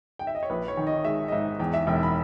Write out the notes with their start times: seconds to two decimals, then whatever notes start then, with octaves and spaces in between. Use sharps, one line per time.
0.19 G5
0.27 E5
0.35 D#5
0.43 C#5
0.50 A#1 B4
0.68 C#5
0.77 D#3
0.87 D#5
1.05 G#3 E5
1.28 D#5
1.32 G#2 E5
1.59 E2 G5
1.74 E5
1.87 E1 G5
2.03 B5